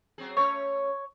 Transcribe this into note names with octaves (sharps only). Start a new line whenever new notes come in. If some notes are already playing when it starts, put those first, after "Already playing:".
F#3 C4 G#4
A3 C#4 C#5